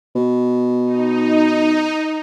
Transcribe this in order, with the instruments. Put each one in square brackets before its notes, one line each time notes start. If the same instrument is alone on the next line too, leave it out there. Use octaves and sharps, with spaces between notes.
[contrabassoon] B2
[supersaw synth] D#4